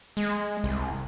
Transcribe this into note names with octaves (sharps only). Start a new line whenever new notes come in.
G#3
C2